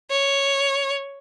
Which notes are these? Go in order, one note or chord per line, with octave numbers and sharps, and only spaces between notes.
C#5